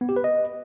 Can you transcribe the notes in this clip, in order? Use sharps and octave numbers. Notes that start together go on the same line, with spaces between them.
B3
G4
B4
D#5